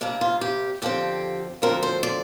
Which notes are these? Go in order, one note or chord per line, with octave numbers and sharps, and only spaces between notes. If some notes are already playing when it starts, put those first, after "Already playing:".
C3 G3 A#3 D4
F4
G4
F2 D3 F3 C4 G4
D2 D3 F3 C4 A#4
C5
D5